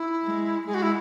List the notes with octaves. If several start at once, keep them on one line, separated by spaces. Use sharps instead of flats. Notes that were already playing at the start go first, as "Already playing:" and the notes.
Already playing: E4
G#3
G#3 G#4
F#4
E4